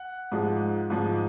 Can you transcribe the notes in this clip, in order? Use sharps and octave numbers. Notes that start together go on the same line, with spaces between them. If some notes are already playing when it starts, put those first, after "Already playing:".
Already playing: F#5
G#2 F3 G#3
G#2 F3 G#3